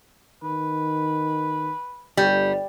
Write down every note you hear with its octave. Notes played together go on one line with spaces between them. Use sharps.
D#3 B4
G1 G3